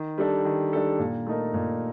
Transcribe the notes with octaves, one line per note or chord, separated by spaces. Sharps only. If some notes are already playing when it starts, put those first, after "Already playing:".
Already playing: D#3
G3 D4 A4
D#3
G3 D4 A4
A#2
A3 D#4 A#4
A#2